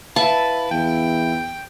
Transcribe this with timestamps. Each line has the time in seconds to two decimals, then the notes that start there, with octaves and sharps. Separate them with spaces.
0.16 E4 B4 E5 F5 A5
0.71 E2 G5